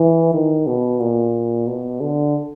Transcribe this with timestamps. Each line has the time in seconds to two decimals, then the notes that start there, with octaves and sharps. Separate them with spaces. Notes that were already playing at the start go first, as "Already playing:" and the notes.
Already playing: E3
0.34 D#3
0.67 B2
1.00 A#2
1.67 B2
2.01 D3